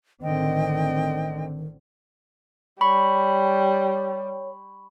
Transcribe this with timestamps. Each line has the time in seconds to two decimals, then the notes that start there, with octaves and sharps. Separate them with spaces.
0.21 A1 D3 D#3 C4 D#5 G5
2.81 G3 C#5 B5 C#6